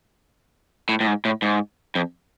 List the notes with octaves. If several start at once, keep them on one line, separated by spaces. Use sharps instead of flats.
A2
A2
G#2
A2
G#2
F2